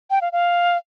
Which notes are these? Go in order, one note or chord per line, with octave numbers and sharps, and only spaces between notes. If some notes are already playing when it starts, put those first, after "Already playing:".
G5
F5
F5